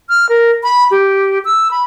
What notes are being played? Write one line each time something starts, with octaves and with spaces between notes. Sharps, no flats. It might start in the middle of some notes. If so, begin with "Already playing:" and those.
F6
A#4
B5
G4
E6
B5